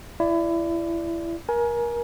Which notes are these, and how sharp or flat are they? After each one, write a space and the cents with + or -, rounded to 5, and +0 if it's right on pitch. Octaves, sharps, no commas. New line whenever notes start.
E4 +25 D5 +0
A#4 +25 G#5 +25